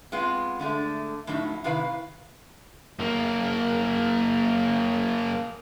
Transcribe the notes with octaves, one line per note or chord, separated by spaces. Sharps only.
G#3 B3 C4 F4
D3 G#3 A3
A2 F3 F#3 D#4 E4
C3 D#3 E4 B4 F5
F#2 A#3